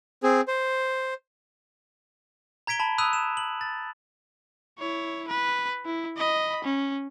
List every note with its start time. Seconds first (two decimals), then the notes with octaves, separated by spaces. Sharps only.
0.23 C4 G#4
0.48 C5
2.67 A#5 G#6 B6 D7 G7
2.80 A5 B5
2.98 B5 D#6 E6 F#6 D#7 F7
3.13 E7
3.37 F#7
3.61 A6
4.79 E4 C#5
5.28 B4
5.85 E4
6.17 D#5 B5
6.65 C#4